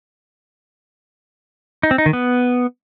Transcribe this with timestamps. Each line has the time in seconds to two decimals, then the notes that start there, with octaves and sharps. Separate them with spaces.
1.83 D#4
1.91 C4
1.98 D#4
2.06 D#3
2.13 B3